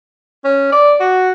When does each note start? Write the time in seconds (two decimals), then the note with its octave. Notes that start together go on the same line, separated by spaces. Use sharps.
0.45 C#4
0.72 D5
1.00 F#4